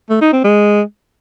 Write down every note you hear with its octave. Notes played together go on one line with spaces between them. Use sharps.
A3
D#4
C4
G#3